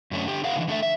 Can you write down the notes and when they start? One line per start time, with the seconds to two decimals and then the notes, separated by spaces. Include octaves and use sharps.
0.11 F#2 D3 A3 C#4
0.25 D3 G4
0.44 G#4 A#4 F5 F#5
0.56 A#2 D3 E3
0.68 D3 A3 A4 E5
0.83 E5